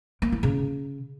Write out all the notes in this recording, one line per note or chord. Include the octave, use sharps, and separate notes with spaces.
A#3
E4
C#3